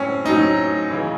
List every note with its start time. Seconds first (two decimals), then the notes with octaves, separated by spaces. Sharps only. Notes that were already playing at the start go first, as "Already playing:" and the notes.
Already playing: A2 F#3 C4 C#4
0.24 A2 F#3 D#4
0.90 C#3 E3